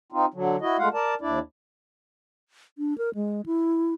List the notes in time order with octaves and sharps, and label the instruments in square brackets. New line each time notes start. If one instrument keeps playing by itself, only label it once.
[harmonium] C4 D#4 F4
D3 F#3
E4 F#4 D#5
G#3 A3 F4 F5 F#5
A#4 D5 A5
D#2 D4 E4 D5
[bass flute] D4
A#4
G#3
E4